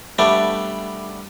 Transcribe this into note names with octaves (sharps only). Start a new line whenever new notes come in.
G3 A3 B3 D4 D5